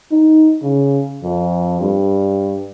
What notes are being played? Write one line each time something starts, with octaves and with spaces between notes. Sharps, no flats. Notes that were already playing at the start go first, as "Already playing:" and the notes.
D#4
C#3
F2
G2